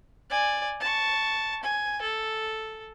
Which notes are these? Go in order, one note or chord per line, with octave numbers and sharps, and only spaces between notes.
D5 G#5
A5 C#6
G#5
A4